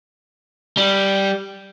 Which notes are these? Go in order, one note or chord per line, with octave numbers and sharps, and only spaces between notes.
G3